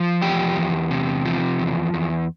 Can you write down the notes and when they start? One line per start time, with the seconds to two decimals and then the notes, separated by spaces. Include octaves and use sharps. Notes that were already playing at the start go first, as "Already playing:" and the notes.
Already playing: F3
0.22 E2 G4
0.56 E2
0.91 C3
1.25 F3
1.59 E2
1.94 E2